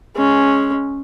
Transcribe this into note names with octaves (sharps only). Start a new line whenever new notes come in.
G#3 C#4